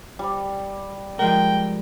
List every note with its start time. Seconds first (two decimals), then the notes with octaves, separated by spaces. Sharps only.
0.19 G3
1.19 F3 G#3 A#4 G5